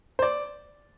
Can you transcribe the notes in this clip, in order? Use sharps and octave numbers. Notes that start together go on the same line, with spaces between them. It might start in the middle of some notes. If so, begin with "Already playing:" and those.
C5
D5